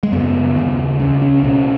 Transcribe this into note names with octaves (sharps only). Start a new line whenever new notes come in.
G#3
F#2 C#3 B3
D#2 C#3
C#2 C#3 C#4
C#4
C#2 B2 C#4